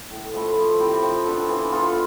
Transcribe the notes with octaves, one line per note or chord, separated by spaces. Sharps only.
A2
F3 A3 E4
F3
C4 E4 G4
F3
B3 D4 A4
E3
B3 F4 A4